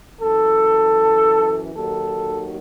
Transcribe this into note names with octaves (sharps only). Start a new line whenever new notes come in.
F#2 E3 A4
D#2 D#3 F#3 A4